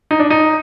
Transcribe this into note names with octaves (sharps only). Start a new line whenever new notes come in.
D#4
D4
D#4